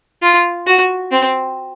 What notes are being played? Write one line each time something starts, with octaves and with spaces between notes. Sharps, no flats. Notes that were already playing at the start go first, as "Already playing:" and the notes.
F4
F#4
C4